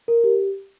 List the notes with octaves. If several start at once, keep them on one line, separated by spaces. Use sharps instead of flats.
A#4
G4